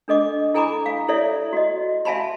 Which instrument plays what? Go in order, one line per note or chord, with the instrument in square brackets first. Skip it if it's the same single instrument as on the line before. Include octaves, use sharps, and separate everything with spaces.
[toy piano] D4 A4 D#5 D6
E4 A4 G#5 A#5 B5 D6
F5
E4 A4 C#5 D5 E5
F#4 D#5
E5 F5 G#5 A5 B5 C6